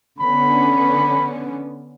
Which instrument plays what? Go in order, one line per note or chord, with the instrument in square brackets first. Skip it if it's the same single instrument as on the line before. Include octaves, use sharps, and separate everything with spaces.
[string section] D3 B3 C#4 [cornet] B5